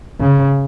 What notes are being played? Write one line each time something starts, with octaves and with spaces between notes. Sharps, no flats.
C#3